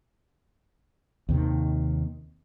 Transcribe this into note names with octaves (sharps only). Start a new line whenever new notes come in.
D#2 C3 D#3